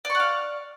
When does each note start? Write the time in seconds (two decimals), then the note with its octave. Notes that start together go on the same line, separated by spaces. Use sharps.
0.05 D5
0.10 C#6
0.15 F#5
0.20 F5